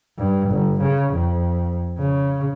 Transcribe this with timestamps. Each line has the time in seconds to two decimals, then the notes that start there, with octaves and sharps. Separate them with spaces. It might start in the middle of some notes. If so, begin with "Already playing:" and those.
0.18 G2
0.50 G1
0.81 C#3
1.14 F2
1.98 C#3